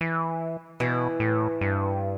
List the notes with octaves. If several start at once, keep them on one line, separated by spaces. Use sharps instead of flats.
E3
B2 E3
A2
G2